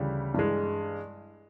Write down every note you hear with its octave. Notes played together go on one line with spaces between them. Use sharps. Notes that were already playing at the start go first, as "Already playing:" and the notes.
Already playing: D2 C#3 E3 G3
G2 E3 G#3